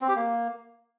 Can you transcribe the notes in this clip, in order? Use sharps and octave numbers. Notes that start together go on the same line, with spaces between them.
C4
G4
A#3